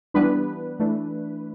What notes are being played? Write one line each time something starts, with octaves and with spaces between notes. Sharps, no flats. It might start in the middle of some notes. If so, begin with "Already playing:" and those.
E3 G3 B3 D4 B4
E3 A3 D4